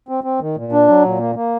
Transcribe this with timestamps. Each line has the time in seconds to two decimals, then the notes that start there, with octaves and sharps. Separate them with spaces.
0.09 C4
0.24 C4
0.40 D#3
0.57 A#2
0.72 D4
0.88 F#3
1.04 A#2
1.19 A#3
1.35 A#3